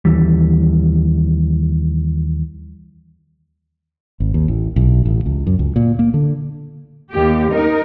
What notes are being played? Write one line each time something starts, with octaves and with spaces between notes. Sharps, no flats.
D#2 E3 G3
G#1
D#2
A1
B1
A1
C#2
F#2
C#2
A#2
A#3
D3
D#2 G4
D#4 A#4